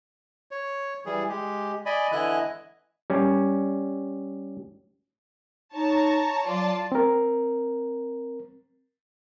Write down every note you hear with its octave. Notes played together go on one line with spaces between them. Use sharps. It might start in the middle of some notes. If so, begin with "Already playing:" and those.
C#5
E3 G3 G#4
G#3 G4
D5 D#5 G#5 B5
D3 E3 E4 D#5 G#5 F#6
G3 C#4
D#4 C#5 A5 A#5
F#3 F4 D5 A5
C4 A#4